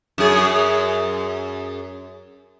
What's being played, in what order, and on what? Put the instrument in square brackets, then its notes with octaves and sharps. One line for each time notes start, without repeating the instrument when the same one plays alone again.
[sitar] F#2 G#4